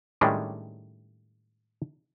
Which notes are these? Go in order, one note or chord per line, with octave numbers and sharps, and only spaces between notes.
A2 D#3 G3 G#3 C#4 D4